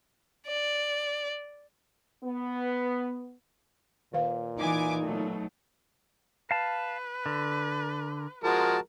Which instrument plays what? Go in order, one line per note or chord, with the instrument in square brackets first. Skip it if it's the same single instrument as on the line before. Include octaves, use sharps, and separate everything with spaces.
[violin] D5
[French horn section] B3
[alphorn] A#2 [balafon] D#3 B4 F5
[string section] E3 G#5 D6 [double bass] D#4
[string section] B2 F#3 A3
[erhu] B4 [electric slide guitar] F5 A5
[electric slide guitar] D3
[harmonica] F3 G#3 A#4 [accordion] F#4 A5